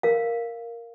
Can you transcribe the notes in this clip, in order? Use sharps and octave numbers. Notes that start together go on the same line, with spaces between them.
A#4 F5